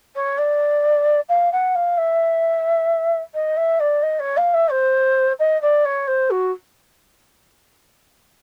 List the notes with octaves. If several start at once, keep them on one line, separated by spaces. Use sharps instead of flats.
C#5
D5
F5
F#5
F5
E5
D#5
E5
D5
D#5
C#5
F5
E5
C5
D#5
D5
C#5
C5
F#4